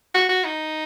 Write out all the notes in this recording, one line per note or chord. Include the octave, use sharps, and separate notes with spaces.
F#4
F#4
D#4